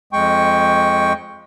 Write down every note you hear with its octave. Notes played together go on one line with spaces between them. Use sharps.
F2 G#3 G5 C#6